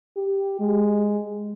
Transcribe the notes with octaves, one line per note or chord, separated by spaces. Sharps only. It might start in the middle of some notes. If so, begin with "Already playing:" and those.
G4
G#3